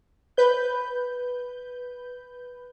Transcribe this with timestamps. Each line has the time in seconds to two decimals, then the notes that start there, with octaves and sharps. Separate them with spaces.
0.37 B4 G6